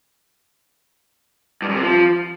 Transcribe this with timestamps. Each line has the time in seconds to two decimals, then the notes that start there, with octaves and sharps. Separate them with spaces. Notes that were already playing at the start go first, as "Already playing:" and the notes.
1.62 G2
1.69 F#2
1.76 C3
1.83 F3